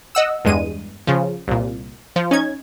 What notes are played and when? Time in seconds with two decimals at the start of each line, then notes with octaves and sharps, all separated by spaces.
0.15 D#5 F#5 E6
0.45 E2 G2 G#3 D#7
1.07 C#3 F3
1.48 C2 A#2
2.16 F3
2.31 C#4 D#4 G#6